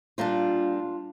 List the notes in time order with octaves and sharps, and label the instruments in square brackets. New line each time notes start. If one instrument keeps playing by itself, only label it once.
[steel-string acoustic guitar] A#2 G3 D4 F4